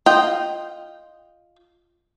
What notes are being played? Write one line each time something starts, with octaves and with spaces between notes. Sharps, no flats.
F4 D#5 G5